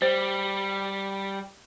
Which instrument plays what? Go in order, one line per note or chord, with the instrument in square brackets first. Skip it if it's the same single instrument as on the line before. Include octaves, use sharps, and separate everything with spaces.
[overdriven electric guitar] G3 [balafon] C5